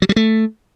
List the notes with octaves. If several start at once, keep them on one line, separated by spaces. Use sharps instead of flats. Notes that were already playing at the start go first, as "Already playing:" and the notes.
F#3
G3
A3